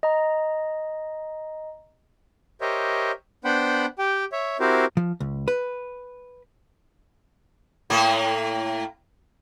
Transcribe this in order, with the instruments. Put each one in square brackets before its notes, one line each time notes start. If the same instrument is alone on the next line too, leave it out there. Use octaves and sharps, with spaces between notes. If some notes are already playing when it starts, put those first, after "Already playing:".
[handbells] D#5 A#5
[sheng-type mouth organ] G4 A#4 C5 C#5 D#5 E5
B3 D4 C5 F#5 G5 B5
G4 G5
C#5 E5
C4 E4 F#4 G4 A#4 C5
[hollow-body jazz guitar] F3
C#2
B4
[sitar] A2 A#3